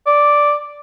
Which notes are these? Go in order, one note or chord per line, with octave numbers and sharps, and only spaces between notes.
D5